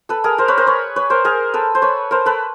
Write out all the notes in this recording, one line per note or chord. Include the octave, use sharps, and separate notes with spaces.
A4 B4
G#4 A#4
A#4 C5
B4 C#5
A#4 C5
B4 C#5
B4 C#5
A#4 C5
G#4 A#4
A4 B4
C5
B4 C#5
A#4 C5
A4 B4